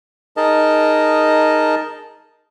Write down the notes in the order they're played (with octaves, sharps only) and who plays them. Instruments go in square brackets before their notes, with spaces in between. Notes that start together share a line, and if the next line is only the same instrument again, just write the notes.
[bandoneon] D#4 G#4 A#4 D#5 A5